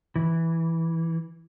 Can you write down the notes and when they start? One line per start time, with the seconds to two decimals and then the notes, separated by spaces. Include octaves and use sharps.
0.16 E3